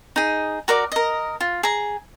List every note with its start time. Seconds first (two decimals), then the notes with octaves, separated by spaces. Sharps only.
0.16 D#4 G#4
0.68 F#4 A#4 D5 D6
0.92 A#4 D#5
1.41 F4
1.63 G#4 A#5